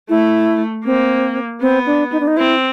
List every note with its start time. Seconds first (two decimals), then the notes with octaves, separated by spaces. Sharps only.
0.09 A3 E4
0.85 A#3 C4
1.61 B3 C4
1.86 D4
2.12 D#4
2.20 D4
2.27 D#4
2.37 C4 E4